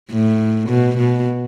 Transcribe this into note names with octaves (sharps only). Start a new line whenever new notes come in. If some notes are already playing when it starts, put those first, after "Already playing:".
A2
B2
B2